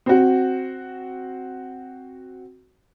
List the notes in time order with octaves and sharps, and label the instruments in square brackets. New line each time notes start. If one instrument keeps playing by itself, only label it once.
[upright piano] C4 F#4